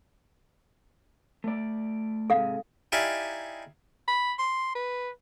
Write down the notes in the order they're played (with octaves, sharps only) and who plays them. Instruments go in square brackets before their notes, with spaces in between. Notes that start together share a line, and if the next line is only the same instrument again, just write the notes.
[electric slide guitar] A3 D5
[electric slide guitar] G#2 C3 G#3 [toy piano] A4 F5
[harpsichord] D#4 E4 G4 D5 F5 G#5
[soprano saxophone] B5
C6
B4